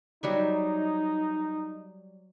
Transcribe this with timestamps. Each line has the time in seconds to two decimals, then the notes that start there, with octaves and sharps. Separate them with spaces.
0.23 F#3 G3 D#4 E5